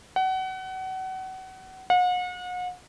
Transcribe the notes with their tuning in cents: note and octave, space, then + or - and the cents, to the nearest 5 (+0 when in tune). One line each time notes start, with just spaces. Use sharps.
F#5 +30
F#5 -40